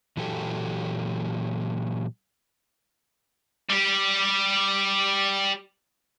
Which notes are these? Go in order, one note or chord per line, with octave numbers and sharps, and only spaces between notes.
A#2 E3 F#3 G4 A4
G3 G4